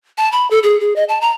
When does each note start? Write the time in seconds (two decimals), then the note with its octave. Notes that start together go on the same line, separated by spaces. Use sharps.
0.18 A5
0.32 B5
0.51 A4
0.63 G#4
0.80 G#4
0.96 D#5
1.09 A5
1.21 A#5